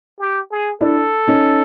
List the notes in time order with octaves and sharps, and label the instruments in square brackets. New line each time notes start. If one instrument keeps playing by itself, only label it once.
[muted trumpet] G4
G#4
[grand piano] D4 E4 [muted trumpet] A4
[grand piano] C#4 D#4